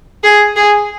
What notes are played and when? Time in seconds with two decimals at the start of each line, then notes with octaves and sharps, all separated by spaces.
0.23 G#4
0.56 G#4